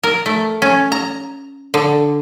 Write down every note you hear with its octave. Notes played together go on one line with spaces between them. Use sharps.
A#4
A3
C#4
A#5
D3